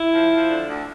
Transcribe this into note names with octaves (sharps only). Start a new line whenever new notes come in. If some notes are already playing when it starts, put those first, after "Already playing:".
Already playing: E4
F3
F3
D3
D2